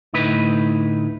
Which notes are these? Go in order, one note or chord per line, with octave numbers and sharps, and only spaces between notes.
D2 A2 D#4 E4 B4